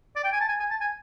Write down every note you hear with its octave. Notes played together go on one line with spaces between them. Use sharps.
D5
G5
G#5
A5
G#5
G#5
A5
G#5